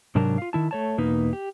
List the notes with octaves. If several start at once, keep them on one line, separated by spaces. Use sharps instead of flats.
G#2 C3 F#3 D4 A#4 A5
F4 F5
D#3 E4 A5
A3 C#5 A5
E2 B2 A#3 D#4 B4
G4